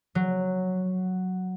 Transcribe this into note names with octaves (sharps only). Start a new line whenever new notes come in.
F#3